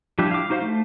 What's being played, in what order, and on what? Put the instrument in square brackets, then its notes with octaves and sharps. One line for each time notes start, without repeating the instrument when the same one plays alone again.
[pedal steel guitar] F3 G3 D4 E4 G4
F5 D6
D#4 F#4 C5 E5 F5
A3